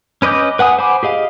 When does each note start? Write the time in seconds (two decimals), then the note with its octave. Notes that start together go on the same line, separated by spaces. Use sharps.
0.22 C#4 B4 D#5 D6 G6
0.59 B4 F#5 G#5 D#6
0.78 C5 F#5 G#5 B5 D6
1.03 G4 G#4 D#5 F5